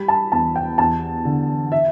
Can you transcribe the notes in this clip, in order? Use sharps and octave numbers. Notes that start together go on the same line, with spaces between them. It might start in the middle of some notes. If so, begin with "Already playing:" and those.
Already playing: G3 B5
A5
E2 A5
G5
E2 A5
D3
E5